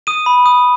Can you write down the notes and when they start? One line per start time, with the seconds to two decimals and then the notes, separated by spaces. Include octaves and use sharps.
0.07 D#6 D#7
0.26 B5
0.46 D#6